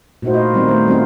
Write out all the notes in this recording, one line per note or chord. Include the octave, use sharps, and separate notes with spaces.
A#2 A3 D#4 E4 F#4 C5
F4 D#5
D#3 G3 B3 C4 D#4
A3 C5
G3 C4 C#4 D#4 F4